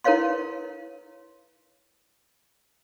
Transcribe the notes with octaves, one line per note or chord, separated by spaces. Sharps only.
E4 A#4 B4 C#5 F5 C6